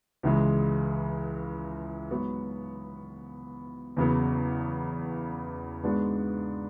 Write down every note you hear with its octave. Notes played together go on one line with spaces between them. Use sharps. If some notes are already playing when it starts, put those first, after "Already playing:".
C#2 C#3 E3 G#3
G#2 F#3 B3 F#4
E2 C#3 F#3 B3
G#2 G#3 B3 D4 F#4